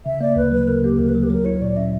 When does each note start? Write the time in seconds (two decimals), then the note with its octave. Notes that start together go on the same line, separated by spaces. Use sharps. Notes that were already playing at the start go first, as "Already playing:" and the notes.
0.05 C#3 E5
0.21 A#3 D5
0.36 D2 B4
0.52 F#3 B4
0.67 C#3 A#4
0.84 A#3 G4
0.99 D2 A#4
1.09 B4
1.14 F#3 A#4
1.23 G4
1.30 F#3 A#4
1.45 E4 C#5
1.62 A#2 D5
1.76 C#4 E5